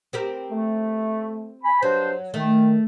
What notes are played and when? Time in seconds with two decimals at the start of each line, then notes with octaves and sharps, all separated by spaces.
0.13 C4 G4 A#4
0.51 A3
1.64 G#5 B5
1.82 G2 F#3 D4 C5
2.34 D#3 A3